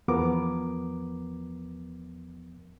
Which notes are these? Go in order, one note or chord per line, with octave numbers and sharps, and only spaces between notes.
E2 F3 B3 A#4 D6